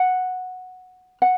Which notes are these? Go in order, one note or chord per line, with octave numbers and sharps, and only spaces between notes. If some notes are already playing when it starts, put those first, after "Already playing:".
Already playing: F#5
F#5